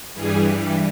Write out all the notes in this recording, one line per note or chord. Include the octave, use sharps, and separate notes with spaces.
G2 E3 G3 G#4